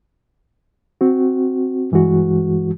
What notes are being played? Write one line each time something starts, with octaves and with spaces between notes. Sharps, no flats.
C4 F#4
G2 E3 G#3 F#4